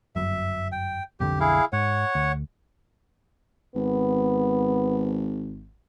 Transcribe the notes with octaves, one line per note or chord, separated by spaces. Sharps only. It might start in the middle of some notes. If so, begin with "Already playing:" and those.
G1 F#2 E5
G5
B1 F2 D3 G4
E4 G#4 F5
G#2 C#5 F#5
D2
G#1 B3